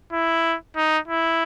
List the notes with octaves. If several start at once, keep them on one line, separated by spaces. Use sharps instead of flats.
E4
D#4
E4